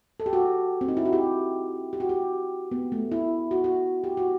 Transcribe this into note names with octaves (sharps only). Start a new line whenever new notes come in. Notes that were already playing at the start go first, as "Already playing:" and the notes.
A4
G4
F#4
C4
D#4
E4
F#4
G4
G4
F#4
G4
B3
A3
E4
F#4
F#4
G4
F#4